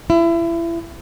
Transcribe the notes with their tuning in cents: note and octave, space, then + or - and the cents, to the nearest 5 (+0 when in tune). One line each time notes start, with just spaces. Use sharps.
E4 +30